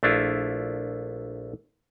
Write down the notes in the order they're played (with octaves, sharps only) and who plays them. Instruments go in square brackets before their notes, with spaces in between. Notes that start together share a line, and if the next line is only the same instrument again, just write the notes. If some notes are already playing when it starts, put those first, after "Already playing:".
[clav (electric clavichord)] A#1 A3 D4 E4 F4